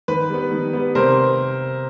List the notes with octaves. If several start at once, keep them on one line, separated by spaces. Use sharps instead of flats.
D#3 B4
G3 B3
D#3
G3 B3
C3 A#4 C5